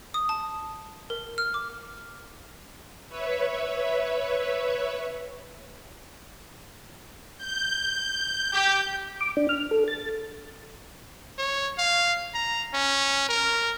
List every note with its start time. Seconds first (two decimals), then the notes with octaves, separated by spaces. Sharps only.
0.14 D#6
0.29 A5
1.10 A#4
1.38 F6
1.54 D6
3.08 B4 C#5 E5
7.37 G6
8.53 G4
9.21 D6
9.37 D4
9.49 F6
9.71 A4
9.88 A6
11.38 C#5
11.78 F5
12.34 A#5
12.74 C#4
13.29 A#4